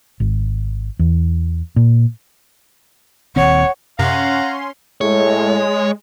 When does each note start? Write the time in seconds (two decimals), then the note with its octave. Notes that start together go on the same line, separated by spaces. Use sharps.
0.20 G#1
0.99 E2
1.76 A#2
3.36 D#1 D#2 C4 C#5 F#5
3.99 F#2 C3 C#4 F5 F#5 A#5 C6
5.01 A2 G#3 C#5